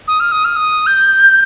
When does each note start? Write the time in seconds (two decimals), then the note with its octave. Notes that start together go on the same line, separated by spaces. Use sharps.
0.07 D#6
0.20 F6
0.32 D#6
0.44 F6
0.56 D#6
0.86 G6